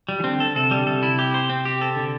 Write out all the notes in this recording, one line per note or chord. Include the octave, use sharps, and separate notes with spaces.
G3
E3
D3 C4
A4
C3 A4
G3
D3
C3 A4
E4
G4
C5
C4
G4
A4
D3